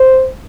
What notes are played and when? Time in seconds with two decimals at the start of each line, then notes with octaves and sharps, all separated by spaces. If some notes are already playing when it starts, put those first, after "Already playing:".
Already playing: C5